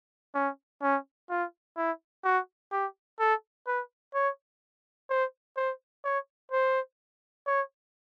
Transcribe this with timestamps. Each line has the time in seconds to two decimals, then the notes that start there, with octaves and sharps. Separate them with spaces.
0.34 C#4
0.82 C#4
1.30 F4
1.77 E4
2.24 F#4
2.72 G4
3.20 A4
3.67 B4
4.14 C#5
5.10 C5
5.57 C5
6.04 C#5
6.52 C5
7.47 C#5